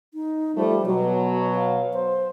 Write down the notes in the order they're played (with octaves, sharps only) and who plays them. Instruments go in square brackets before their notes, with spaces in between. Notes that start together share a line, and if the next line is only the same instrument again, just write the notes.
[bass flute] D#4
[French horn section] F3 A3 [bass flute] G3
[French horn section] B2 F#3 [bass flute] F#4
[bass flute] F5
C5